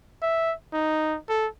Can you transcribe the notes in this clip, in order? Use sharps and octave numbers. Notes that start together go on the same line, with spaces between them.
E5
D#4
A4